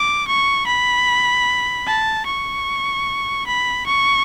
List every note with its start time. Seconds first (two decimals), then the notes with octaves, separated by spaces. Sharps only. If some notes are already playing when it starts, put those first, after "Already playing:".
Already playing: D6
0.27 C#6
0.67 B5
1.87 A5
2.26 C#6
3.47 B5
3.86 C#6